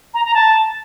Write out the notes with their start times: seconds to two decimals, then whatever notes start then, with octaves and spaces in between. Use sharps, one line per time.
0.14 A#5
0.25 A#5
0.35 A5